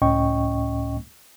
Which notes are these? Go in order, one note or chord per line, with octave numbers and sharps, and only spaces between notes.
C#2 A2 C#4 D#5 G5 C#6